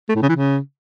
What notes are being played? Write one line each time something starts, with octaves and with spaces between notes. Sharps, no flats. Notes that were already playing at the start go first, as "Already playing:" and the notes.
A3
A2
C#3
E3
C#3